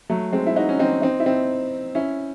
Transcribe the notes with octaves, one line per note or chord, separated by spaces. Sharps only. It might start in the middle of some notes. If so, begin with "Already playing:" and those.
F#3 A3
G#3 C4
E4
D#4 F#4
C#4
C4 D#4
C4 D#4
E4
C4 D#4
C#4 E4